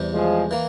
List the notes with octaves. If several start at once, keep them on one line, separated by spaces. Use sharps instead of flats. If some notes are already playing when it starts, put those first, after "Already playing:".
Already playing: E2 C3 G3
F3 G#3
E3 A#3